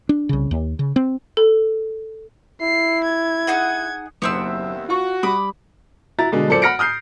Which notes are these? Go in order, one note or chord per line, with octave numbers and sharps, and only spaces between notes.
D4
C2 C#3
D#2
C#3
C4
A4
E4 C7
G#6
D#4 G#4 F#5
F#1 D#2 B3 C4 E5 E6
F4 F#4 C#6
G3 B5 D6 D#6
E4 F#4 A#5 A6
B2 D3 G#3
F#2 A#2 A4 C5 D5 C#7
F#5 B5 F6 A#6 C#7 D7
D#6 F6 G6 C7